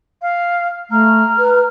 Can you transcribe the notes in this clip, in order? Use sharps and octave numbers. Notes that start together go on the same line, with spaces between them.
F5
A3 A#5 F6
B4